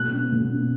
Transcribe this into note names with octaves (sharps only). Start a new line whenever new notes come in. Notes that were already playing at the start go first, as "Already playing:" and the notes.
Already playing: B2 F#6
C#4
B2
C#4